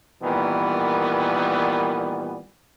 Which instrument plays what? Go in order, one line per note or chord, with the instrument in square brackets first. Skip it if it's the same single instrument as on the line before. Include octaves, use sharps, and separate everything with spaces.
[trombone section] A#2 D#3 E3 G3 B3